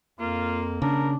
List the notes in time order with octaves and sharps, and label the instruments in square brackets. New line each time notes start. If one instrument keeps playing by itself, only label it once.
[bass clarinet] F2 [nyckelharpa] A#3 [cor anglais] F4
[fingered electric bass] C#3 [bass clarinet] D4 [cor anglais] A#4